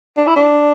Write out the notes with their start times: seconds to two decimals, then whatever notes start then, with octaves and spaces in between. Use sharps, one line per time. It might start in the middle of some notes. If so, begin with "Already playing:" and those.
0.17 D4
0.27 E4
0.36 D4